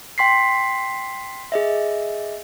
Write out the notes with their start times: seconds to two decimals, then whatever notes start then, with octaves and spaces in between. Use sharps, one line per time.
0.18 G5 C6 B6 C7
1.52 G#4 D#5 E5